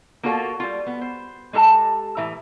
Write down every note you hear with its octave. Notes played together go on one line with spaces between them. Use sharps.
A#3 F4 F#4 A4 C5 C#5
G3 F4
B3
C5
G#3 G4 A4 A5 A#5
A2 E3 E5 A#5